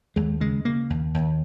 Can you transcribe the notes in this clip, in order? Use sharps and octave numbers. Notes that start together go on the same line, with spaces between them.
D#2 G#3
C#3 G#3
C#3 A#3
D#2
D#2